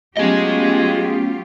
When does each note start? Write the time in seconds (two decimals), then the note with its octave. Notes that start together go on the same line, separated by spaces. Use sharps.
0.17 F#3 A3 B3 C#4 F4 G4 G#4 D#5